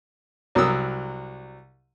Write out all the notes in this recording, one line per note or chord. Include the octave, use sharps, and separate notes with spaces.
C2 F#3 A#4 D#6 E6